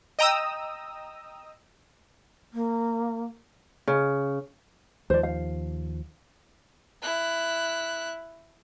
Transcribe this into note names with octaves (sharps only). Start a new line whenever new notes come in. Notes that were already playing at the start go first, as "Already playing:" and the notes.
D#5 G5 A#5 D#6 E6
A#3
C#3
D#2 F3 C5 D5
F5
E4 F#6